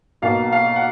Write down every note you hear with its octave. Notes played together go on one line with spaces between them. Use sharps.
B1 B2 A#3 F5
F5
F#5